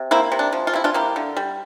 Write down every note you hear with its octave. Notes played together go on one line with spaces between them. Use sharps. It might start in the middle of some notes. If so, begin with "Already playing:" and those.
Already playing: C3
A#3 C4 E4
C3
D4
F3
F4
C3 E4
D4 F4
A#3 E4 G4
D3
G3